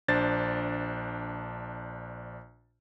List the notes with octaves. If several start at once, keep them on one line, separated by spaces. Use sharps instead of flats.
A#1 D4 C5 A6